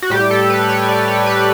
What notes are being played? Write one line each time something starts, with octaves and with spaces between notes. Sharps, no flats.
F#4
A2 G3 G4
A4
B4
C#5
D5
C#5
B4